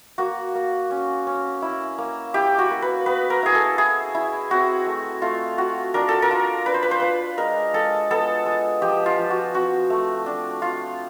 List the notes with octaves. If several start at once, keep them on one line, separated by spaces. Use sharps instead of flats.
A#3 F#4
A#3
C#4
C#4
E4
A#3
E4 G4
F#4
A#3
B4
B3 B4
A#4
E4 G#4
A4
E4 G#4
E4
C4 F#4
A3
A3 F4
F4 F#4
D4 A#4
A4
A#4
F4
D4 B4
C5
B4
C5
F4 B4
G#3 A#4
G#3 A4
B3 A4
G#3
F3 G4
F4
F3
F#4
C4 F#4
A3
D4
F4